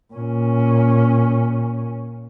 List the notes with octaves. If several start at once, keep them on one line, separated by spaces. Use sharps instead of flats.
A#2 C#4